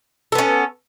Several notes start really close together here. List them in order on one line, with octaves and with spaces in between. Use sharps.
A4 B3 C#4